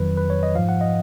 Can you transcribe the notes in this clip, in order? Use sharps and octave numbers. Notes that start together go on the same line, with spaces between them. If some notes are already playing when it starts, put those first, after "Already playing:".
Already playing: F2 D#3 F#3 B4
B4
C#5
D#5
G#2 F3 F5
F#5
D#5